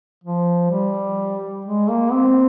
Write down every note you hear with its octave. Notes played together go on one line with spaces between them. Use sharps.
F3
G3
G#3
A#3
C4